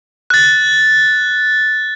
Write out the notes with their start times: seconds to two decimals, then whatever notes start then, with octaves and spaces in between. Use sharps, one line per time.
0.30 F#6 A6